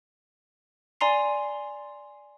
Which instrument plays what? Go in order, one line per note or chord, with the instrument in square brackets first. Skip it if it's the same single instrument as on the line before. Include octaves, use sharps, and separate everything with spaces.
[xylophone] D5 G#5 A#5 C6 C7